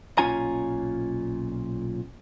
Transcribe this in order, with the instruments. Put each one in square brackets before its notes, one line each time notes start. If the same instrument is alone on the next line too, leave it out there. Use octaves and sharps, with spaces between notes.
[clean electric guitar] B1 A#2 C#4 F4 G#5 A#5